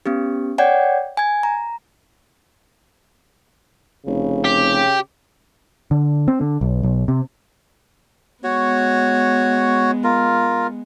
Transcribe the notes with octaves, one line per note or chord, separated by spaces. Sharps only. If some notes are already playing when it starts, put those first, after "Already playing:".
B3 C#4 G4
C#5 D5 F#5 G5 G6 G#6
G#5 G#6
A#5
F1 C#3
G4
D3
C4
D3
B1
B1
C3
G#3 B3 F#4 C#5
F4 A#4